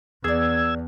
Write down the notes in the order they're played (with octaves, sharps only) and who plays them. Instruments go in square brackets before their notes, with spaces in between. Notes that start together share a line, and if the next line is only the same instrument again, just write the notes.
[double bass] E2 [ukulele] G#4 D5 [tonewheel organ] E6 G#6